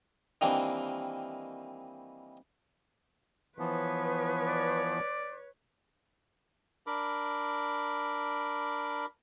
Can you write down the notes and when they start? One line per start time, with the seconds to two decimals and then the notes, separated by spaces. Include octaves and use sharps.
0.41 D#3 E3 G3 A#3 C4 D4
3.59 E3 F3 B3 B4 C#5
4.47 D5
6.87 D4 A#4 B5 D6